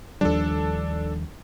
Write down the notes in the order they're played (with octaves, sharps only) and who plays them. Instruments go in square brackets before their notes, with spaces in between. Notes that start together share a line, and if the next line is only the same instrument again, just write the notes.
[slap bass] D#2 F3 G3 [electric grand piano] D4 A4